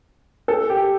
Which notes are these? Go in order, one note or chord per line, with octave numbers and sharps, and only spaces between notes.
A4
G4